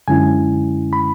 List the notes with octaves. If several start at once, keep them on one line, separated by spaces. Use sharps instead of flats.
F#2 D3 G#3 C#4 E4 G#5
B5